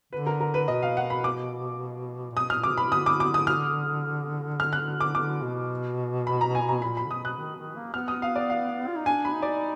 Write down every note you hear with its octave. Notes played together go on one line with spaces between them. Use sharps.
D3 B4
A#4
A#4
B4
B2 D#5
F5
F#5
B5
D6
A#2
B2 D#6
A#2 F6
D3 D6
B2 B5
D3 D#6
D6
D6
D#6
F6
F6
F#6
D6
D3 D6
B2
B5
A#5
G#5
A#5
A#2 B5
B5
D3
B2 D#6
F#6
D#3
D#3
A#3
B3 F6
D#6
F5
D5
F5
F4
D#4
D4 G#5
B5
D#4
D5